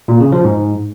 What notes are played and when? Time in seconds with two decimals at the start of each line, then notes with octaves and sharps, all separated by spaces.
0.08 A#2
0.20 C#3
0.32 F3
0.44 G#2